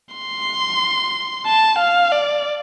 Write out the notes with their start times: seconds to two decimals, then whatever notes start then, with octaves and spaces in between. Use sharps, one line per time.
0.15 C6
1.46 A5
1.78 F5
2.12 D5